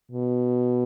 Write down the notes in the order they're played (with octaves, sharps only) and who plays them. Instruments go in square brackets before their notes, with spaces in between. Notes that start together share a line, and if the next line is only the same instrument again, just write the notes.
[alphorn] B2